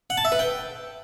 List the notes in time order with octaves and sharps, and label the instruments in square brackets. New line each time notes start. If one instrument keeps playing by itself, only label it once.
[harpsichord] F#5
A5
E5
B4
G5